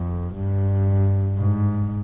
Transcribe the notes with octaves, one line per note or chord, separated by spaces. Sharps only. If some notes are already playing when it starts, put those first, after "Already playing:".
Already playing: F2
G2
G#2